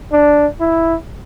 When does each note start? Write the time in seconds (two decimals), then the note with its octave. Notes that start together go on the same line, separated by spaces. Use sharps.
0.12 D4
0.61 E4